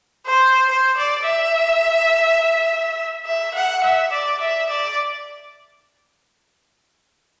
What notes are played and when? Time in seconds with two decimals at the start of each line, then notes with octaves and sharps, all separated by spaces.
0.26 C5
0.69 C5
0.97 D5
1.26 E5
3.26 E5
3.54 F#5
3.84 E5
4.12 D5
4.40 E5
4.69 D5